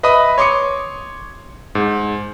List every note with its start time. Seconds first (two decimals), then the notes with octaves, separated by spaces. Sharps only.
0.03 B4 D#5 E5 B5 D#6
0.38 C#5 C6 D6 D#6 C#7
1.75 G#2